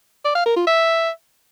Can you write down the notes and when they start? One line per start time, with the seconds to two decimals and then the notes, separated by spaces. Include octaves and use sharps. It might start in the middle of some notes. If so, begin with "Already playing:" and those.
0.24 D5
0.35 F5
0.46 A#4
0.56 F4
0.67 E5